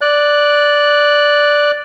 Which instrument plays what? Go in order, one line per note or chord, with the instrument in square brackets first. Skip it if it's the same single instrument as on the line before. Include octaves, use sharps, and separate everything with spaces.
[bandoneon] D5 F#6